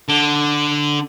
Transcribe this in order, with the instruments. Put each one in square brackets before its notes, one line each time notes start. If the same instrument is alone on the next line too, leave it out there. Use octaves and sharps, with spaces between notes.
[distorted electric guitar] D3